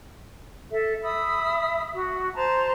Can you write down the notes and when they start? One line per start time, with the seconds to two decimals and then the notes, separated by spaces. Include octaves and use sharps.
0.71 A4 E5
1.03 E5 B5 D#6 E6
1.95 F#4
2.36 C5 A5 A#5